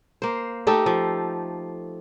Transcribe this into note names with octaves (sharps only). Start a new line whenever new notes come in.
A#3 C5
A3 D#4 G4 A4
F3